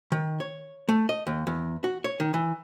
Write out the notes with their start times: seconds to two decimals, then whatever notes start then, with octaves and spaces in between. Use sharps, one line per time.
0.12 D#3
0.40 C#5
0.89 A3
1.09 D#5
1.27 D#2
1.47 E2
1.84 F#4
2.04 C#5
2.20 D#3
2.34 E3